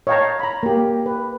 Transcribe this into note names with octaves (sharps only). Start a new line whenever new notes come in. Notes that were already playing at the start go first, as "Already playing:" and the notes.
C#5 D#5 F5 G5 A5 A#5
A#5 B5
A#3 G4
B4